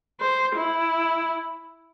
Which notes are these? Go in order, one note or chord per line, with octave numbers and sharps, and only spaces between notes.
C5
E4